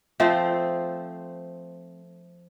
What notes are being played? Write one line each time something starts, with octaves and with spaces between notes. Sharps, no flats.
F3 A3 C4 C5